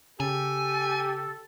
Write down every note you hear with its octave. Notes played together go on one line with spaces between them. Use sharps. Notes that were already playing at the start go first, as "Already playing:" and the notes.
C#3 G4 A4 G#5